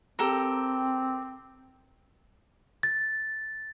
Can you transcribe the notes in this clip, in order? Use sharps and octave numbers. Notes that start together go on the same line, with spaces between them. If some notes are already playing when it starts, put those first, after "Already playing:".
C4 G4 A4 A#4
A6